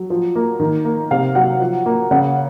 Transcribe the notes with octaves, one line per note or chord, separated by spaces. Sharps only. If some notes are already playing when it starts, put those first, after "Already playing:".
Already playing: F#3
F3
A#3
D#3
A#3
C3 F5
F#3 F#5
F3
A#3
C#3 F#5